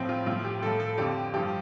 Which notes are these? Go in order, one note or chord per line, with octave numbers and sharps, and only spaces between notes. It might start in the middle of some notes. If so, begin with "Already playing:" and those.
Already playing: A2 F3 C4
F4
A2 F3 F4
G4
A2 F3 A4
A4
F2 D3 F3 G4
G2 F3 G4